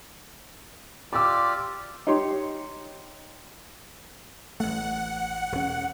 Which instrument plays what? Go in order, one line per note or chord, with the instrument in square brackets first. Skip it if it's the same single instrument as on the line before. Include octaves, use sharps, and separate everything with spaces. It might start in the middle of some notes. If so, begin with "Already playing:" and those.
[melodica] F4 G4 D5 [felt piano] D6 E6
[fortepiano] D#4 G4 C#5 C6
[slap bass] A1 A3 [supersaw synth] F#5
[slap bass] E1 C#4